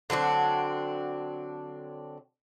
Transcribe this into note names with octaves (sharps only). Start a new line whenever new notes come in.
D3 F#3 C4 D4